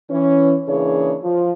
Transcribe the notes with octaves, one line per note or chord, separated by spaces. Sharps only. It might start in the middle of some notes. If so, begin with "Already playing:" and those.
E3 C#4
C#3 E3 A#3 D4 G#4 C#5
F3 F4